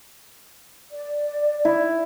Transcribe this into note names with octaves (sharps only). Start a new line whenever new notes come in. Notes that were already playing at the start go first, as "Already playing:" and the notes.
D5
E4